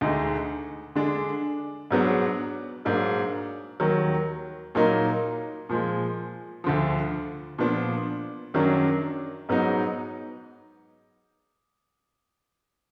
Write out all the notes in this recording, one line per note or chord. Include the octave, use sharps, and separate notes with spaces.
D2 D3 G#3 D#4
D3 G#3 D4
G#2 F#3 B3 D4
G#2 F#3 A#3 D4
D#2 D#3 F#3
A#2 F#3 A#3 D#4
A#2 F3 G#3
D2 D3 F3
A#2 F3 B3 D4
F#2 D#3 F#3 D4
G#2 F#3 B3 D#4